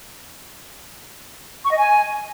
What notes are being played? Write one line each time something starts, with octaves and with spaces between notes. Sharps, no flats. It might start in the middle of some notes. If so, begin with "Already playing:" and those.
C#6
D#5
G#5